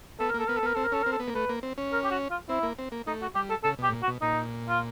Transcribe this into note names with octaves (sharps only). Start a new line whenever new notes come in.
B3 A4
A#4
A#3 A4
B3 A#4
A4
B3 A#4
C4 A4
A#4
C#4 A4
C4 A#4
A4
B3
A#3
A3 B4
A#3
C4
C#4
A#4
G4
F#4
F4
C4 E4
A#3
C4
A#3
A3 D#4
F#4
G3 G4
A4
C#3 A4
B2 G4
A2
A#2
F#4
B2
A#2 D#4
F4